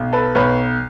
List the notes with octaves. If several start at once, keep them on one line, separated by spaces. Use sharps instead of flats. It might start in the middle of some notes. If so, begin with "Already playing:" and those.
Already playing: B1
A4 B4
B1 B4 C#5